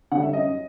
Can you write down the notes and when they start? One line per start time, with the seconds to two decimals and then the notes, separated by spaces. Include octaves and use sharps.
0.12 D3 G3 F#5
0.22 E5
0.33 F#2 D#5